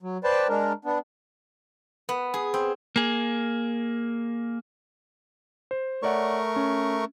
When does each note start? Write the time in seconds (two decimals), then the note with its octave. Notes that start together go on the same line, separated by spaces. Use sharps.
0.02 F#3
0.24 B4 C5 D5 G5 A5
0.49 G#3 D4 A#4
0.85 B3 D4
2.09 B3
2.34 G#4
2.54 C4
2.96 A#3 G#4
5.71 C5
6.03 A3 A#4 C#5 D5 F#5 C#6
6.56 C#4